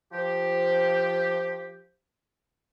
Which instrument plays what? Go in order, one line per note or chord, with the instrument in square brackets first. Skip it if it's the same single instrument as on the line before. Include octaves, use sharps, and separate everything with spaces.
[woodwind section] F3 G4